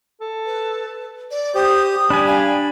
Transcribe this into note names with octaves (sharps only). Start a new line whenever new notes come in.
A4
B4
D5
G4 C5 D#6
G3 D4 G#5 B5
F5